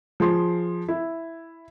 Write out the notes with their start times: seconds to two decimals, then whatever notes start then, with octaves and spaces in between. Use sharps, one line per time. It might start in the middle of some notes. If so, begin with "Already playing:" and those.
0.20 F3 G#4 C6
0.88 E4